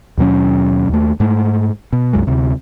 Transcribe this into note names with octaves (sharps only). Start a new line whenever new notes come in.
D#2 B2 F#3 C#4
D#2 A3
G#2 A3
B2
C2 F#2 F#3 G#3
D2 C3